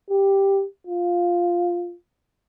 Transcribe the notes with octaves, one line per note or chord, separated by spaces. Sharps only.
G4
F4